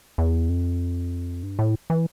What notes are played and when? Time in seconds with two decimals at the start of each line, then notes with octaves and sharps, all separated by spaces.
0.18 E2
0.49 F2
1.43 G2
1.59 A2
1.90 E3